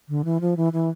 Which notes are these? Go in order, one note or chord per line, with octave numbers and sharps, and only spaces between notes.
D3
E3
F3
E3
E3